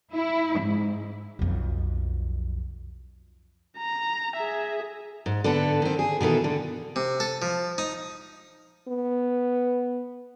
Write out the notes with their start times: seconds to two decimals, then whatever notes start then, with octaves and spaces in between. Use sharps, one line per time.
0.12 E4
0.59 G#2
1.39 B1 F2
3.78 A#5
4.37 G#4 E5
5.26 G#2
5.44 D3 B3 A4
5.82 D#3 C4
5.99 G#4
6.21 B2 D#3 E3 A4
6.44 D3
6.96 C3
7.20 A4
7.42 F3
7.78 D#4
8.88 B3